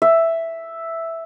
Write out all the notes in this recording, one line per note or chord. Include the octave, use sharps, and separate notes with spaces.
E5